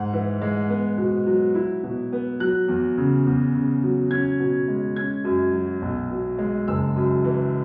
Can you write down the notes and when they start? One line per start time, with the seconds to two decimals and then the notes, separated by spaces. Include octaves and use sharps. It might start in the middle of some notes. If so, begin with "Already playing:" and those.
Already playing: G#2 F#5
0.13 E3
0.42 G#3
0.70 B3
0.98 B2
1.27 F#3
1.55 E4
1.84 B2
2.12 B3
2.40 F#3 F#6
2.68 E2
2.98 C#3
3.26 E2
3.54 C#3
3.83 F#3
4.11 C#4 G#6
4.40 B2
4.68 G#3
4.96 C#4 G#6
5.25 F#2
5.53 F#3
5.82 B1
6.11 B2
6.38 G#3
6.68 F#1 E6
6.96 F#2
7.24 E3